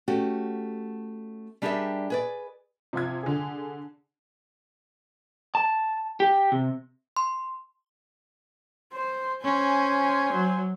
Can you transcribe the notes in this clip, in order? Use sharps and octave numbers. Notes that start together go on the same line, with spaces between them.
A3 C#4 F#4 G4
G3 D4 G4 G#4 A#4 E5
G#4 B4 D5
C3 F3 F4 G#6
D3 G#4
A5
G4
C3
C6
C5
C#4 C5 G#5
F#3